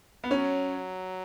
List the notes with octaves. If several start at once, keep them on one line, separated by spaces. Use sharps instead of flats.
B3
F#3 C#4